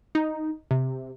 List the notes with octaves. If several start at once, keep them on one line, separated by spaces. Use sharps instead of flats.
D#4
C3